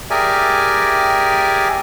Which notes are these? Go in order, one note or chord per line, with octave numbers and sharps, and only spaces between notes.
G4 G#4 A#4 D5 E5 G#5